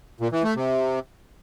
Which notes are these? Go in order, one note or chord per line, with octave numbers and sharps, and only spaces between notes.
A#2
E3
A3
C3